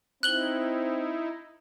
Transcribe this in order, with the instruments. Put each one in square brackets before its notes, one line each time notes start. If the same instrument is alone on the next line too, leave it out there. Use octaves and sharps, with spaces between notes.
[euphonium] C4 [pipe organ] D#4 E4 [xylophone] F#6 F#7 G7